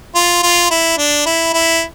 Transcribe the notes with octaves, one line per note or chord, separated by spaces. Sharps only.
F4
F4
E4
D4
E4
E4